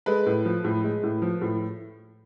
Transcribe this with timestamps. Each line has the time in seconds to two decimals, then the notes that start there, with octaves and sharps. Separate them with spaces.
0.06 G#3 A4 B4
0.26 A2
0.45 F3
0.64 A2
0.84 G#3
1.03 A2
1.22 F3
1.42 A2